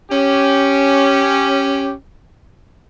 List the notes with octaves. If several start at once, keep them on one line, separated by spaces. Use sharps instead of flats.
C#4 G4